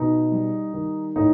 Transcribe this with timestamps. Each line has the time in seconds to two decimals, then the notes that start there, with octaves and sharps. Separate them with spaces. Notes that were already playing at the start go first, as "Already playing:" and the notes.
Already playing: B2 D#4
0.32 G3
0.73 D#3
1.16 A2 D#4